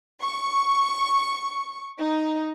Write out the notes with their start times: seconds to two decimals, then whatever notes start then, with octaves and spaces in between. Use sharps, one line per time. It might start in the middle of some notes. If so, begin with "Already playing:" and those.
0.21 C#6
1.99 D#4